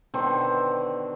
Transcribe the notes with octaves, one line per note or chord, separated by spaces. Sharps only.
B2 D3 D#3 C4